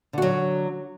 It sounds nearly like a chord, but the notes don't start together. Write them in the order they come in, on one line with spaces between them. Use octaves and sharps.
D3 F#4 F#3